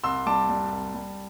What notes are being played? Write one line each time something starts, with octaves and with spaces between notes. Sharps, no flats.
C2 C6 E6
G3 A5 D6
G3
C2
G3